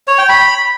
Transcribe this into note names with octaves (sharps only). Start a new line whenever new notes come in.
C#5
G5
B5